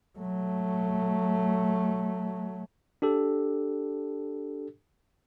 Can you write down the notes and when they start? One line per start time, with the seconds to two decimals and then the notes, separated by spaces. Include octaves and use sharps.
0.19 F#3 A3
3.02 D4 G4 A4